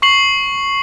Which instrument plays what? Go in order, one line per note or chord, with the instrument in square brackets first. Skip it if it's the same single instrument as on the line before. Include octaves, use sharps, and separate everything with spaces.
[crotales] C#6 C7 F#7